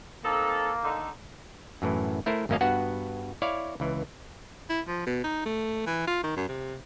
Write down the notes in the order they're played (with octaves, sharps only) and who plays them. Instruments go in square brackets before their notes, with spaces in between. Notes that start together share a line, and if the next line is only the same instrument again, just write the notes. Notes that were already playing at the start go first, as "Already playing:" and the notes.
[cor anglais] A#3 [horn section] C4 D#4 A4
[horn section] D3 D#4
[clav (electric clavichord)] F#2 A2 E3
A3 E4 A#4 C5
G#1 F#2 A#3 C#4 D#5 F5
G2 B3 F#4 F#5
E4 C#5 D5 F5
C#2 E3
[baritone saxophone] E4
F3
B2
D#4
A3
E3
F4
D#3
F#2
C3